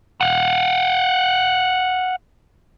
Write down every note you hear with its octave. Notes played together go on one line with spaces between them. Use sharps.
F5 F#5